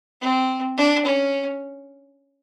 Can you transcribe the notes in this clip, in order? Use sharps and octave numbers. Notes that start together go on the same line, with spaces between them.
C4
D4
C#4